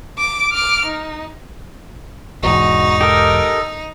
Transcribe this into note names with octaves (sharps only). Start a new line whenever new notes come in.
D6
D6 F6
D#4
E1 E2 G#2 D#4 F#4
G4 A4 A#4 D#5